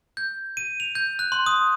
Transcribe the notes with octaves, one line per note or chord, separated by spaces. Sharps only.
G6
D#7
F7
G6
F#6
C6
D#6